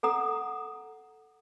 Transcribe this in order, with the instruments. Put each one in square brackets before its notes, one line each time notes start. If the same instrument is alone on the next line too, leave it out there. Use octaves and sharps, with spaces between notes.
[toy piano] A4 F#5 A#5 D#6